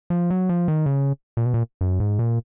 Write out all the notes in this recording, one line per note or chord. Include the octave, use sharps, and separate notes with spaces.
F3
F#3
F3
D#3
C#3
A#2
B2
A#2
F#2
G#2
A#2